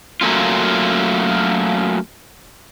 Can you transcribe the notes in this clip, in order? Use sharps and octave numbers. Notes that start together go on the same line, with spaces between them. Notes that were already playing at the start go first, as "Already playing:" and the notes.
F#3 A3 A#3 C#4 F4